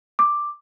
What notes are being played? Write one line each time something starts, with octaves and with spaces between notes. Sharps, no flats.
D6